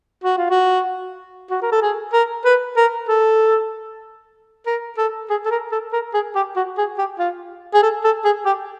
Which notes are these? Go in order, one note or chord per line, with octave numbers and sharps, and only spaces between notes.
F#4
F4
F#4
F#4
A#4
A4
G#4
A#4
B4
A#4
A4
A#4
A4
G#4
A4
A#4
A4
A#4
G#4
G4
F#4
G#4
G4
F4
G#4
A4
A4
G#4
G4